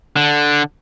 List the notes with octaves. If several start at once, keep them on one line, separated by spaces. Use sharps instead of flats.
D3